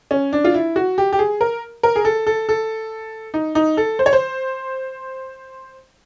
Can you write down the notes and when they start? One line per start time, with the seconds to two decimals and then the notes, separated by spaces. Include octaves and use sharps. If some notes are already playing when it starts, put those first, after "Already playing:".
0.11 C#4
0.33 D4
0.44 F4
0.54 E4
0.76 F#4
0.98 G4
1.13 G4
1.19 G#4
1.41 A#4
1.83 A#4
1.96 G#4
2.05 A4
2.27 A4
2.49 A4
3.34 D#4
3.55 D#4
3.77 A4
3.99 C5
4.06 C#5
4.13 C5